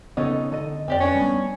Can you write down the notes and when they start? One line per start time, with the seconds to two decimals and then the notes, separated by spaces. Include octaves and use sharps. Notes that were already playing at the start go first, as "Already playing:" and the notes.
0.17 C#3 B3 C#4 D#4 A4 C#5 D#5
0.52 D3 A4 D#5
0.88 F2 C4 G4 D5
1.00 C#4 D4 B4
1.15 G3 G#3 B3